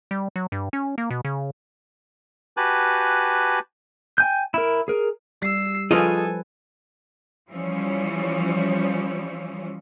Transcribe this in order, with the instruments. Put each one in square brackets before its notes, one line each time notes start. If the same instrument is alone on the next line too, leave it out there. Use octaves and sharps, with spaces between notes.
[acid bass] G3
F#3
G2
C#4
A#3
B2
C#3
[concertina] F#4 G4 B4 G#5 A5 F#6
[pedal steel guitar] G5 G#5 G6
E4 A#4
G#4 A#4
[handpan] G3 [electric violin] E6 C7
[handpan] F3 B4 [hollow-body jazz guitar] F4 G#4 D#5 [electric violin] A4 G#5
[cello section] E3 F3 G3 C#4